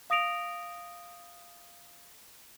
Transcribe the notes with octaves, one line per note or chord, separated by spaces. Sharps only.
F5 D#6 A#6 D7 F7